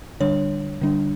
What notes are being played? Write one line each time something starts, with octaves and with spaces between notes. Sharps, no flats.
D3 G3 D4 C#5
D3 G3 D4